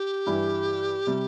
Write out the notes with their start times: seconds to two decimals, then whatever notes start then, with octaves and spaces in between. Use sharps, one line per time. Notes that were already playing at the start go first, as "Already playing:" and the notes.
Already playing: G4
0.27 G2 E3 G3 E4
1.07 C3 G3